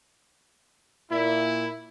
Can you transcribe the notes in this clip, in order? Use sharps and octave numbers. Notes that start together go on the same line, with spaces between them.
A#2 E4